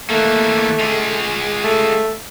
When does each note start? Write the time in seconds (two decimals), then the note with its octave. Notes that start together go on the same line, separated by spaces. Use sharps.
0.10 E3 A3 A#3
0.79 G#3 F4
1.64 A3